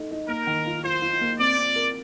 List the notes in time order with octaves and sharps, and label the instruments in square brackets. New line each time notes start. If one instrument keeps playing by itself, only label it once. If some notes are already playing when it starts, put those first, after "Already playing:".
Already playing: [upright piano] A3 D#4
D#4
[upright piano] A#3 [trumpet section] A#4
[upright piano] D#3
F4
[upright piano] F4 [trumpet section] C5
[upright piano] F4
A#3
[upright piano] C4 [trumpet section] D5
[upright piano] C4
A#4